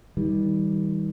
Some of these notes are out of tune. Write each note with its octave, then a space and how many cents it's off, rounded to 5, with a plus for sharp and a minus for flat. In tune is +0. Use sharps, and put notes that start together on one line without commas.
D#3 +35 G3 +0